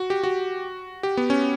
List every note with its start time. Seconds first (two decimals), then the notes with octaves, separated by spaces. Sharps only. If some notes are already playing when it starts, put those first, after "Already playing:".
Already playing: F#4
0.10 G4
0.23 F#4
1.03 G4
1.17 B3
1.30 C#4